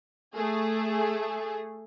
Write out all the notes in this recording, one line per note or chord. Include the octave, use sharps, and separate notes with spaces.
A3 G#4